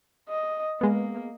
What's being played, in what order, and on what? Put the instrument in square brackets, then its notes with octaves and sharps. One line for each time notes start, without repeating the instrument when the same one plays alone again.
[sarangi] D#5
[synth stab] G#3 B3 [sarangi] A#3